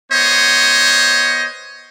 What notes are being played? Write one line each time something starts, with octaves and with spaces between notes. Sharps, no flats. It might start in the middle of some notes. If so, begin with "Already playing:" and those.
B3 C5 C#5 D#5